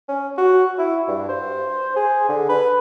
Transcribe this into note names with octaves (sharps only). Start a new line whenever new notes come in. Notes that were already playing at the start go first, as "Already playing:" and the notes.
C#4
F#4
E4
G2
C5
G#4
D3
B4